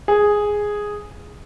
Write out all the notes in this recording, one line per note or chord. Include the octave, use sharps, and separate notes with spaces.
G#4